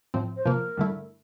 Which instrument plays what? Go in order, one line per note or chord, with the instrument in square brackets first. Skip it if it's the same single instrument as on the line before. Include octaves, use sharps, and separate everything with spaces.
[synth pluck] A2 F3 C4
[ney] C5
[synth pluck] C3 F3 A#3 [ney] A#4
[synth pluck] G2 D3 A3 E4